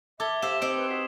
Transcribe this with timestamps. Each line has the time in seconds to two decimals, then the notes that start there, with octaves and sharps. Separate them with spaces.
0.20 A4 E5 D6 G#6 G7
0.42 G4 C5 F5 E6 E7
0.62 C4 D#4 C5 D7
0.76 B4
0.89 F#4 D#6 B6 C7